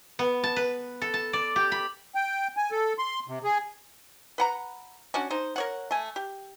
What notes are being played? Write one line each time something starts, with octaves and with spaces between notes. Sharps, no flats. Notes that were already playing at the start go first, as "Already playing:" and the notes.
B3
A5
B4
A4
A5
D5
G4
B5
G5
G#5
A4
C6
C3
G#4
B4 F#5 A#5
C#4 D4 F#4
D#4 C5
A#4 C#5 F#5
A3 G#5
G4